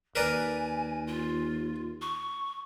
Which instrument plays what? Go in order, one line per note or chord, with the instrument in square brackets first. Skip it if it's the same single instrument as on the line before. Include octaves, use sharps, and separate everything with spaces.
[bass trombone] D#2 [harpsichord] A#4 B4 D5 [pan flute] G#5
[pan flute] F4
C#6